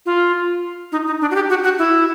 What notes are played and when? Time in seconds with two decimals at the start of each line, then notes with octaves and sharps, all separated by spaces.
0.06 F4
0.92 D#4
1.07 D#4
1.21 D4
1.31 F#4
1.35 G4
1.50 F#4
1.63 F#4
1.78 E4